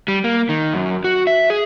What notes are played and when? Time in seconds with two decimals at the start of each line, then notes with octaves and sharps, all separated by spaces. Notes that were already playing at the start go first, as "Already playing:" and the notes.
0.08 G3
0.24 A#3
0.49 D#3
0.73 F#2
1.04 F#4
1.27 E5
1.50 G#4